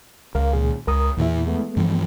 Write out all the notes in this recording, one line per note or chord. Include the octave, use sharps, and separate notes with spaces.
C#2 A#4 F5
A#2 D#3 G#4
C#2 A#4 A#5 D#6
E2 A#2 E3 E4
G#3 A3 B3
G2 E3 F3